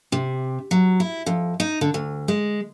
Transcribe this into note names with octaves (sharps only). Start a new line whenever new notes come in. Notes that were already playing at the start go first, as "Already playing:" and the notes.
C3
F#3
E4
F2
D#4
D3
D2
G#3